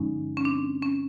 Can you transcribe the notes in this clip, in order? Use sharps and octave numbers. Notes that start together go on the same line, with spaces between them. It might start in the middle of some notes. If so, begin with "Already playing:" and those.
Already playing: G2 D3 F3 G#3 C#4 D#4
C#4
C4 D4
C#4